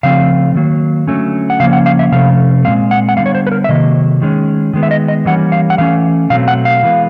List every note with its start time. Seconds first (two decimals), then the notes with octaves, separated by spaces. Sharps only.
0.03 C#3 F3 A3 C4 F5
0.55 D#3 F#3 A#3
1.07 D3 F#3 A3 C#4
1.50 F#5
1.60 C#3 F3 A#3 C#4 F5
1.73 F#5
1.86 F5
1.99 E5
2.12 C3 F3 A3 C#4 F5
2.64 A#2 F3 G#3 C4 F5
2.91 F#5
3.09 F#5
3.17 D3 G3 B3 F5
3.26 C#5
3.35 C5
3.47 B4
3.52 A#4
3.64 E5
3.69 C3 D#3 F#3 A#3 D#5
4.22 D#3 G#3 C#4
4.73 D#3 G#3 B3
4.83 E5
4.91 D#5
5.08 D#5
5.25 E3 G3 A#3 C#4 F#5
5.52 F5
5.70 F#5
5.78 E3 A3 C#4 F5
6.30 B2 F#3 A3 C4 F5
6.48 F#5
6.65 F5
6.83 E3 G#3 B3